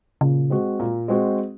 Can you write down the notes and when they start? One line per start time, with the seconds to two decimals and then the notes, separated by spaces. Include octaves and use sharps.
0.21 A#2 C#3
0.50 G#3 C4 F#4
0.79 A#2
1.08 G#3 C4 F#4